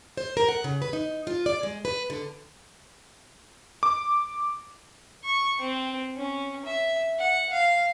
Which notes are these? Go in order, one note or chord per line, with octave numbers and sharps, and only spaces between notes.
C5
A#4
F#5
C#3
B4
D#4
F4
D5
G#3
B4
D3
D6
C#6
C4
C#4
E5
F#5
F5